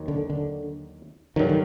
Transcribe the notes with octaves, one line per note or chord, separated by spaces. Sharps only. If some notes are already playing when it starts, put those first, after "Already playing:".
Already playing: D#2 D#3 F#3
D3
D3
G2 D3 D#3 F#3
D#3